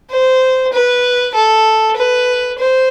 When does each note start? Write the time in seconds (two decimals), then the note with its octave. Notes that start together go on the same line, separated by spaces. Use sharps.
0.11 C5
0.73 B4
1.34 A4
1.96 B4
2.58 C5